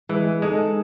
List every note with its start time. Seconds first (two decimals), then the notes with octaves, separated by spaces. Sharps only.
0.09 E3 G#3
0.42 G#3 D#4 A4